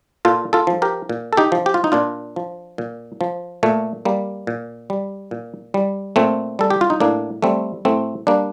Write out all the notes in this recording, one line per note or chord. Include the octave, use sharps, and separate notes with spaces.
A#2 F4 A4
F4 A4
F3
G4 A#4
A#2
A4
D#4 G4
F3
G4
F4
D#4
A#2 D4 F4
F3
A#2
F3
A#2 A3
G3 A#3
A#2
G3
A#2
G3
A#2 A3 C4
G3 A4
G4
F4
D#4
A2 A#3 D4
G3 A3 C4
A2 A3 C4
G3 A#3 D4